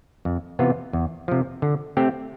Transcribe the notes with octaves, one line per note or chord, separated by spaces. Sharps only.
F2
C3 E3 B3 F4
E2
C3 F3
D3
A3 C4 G4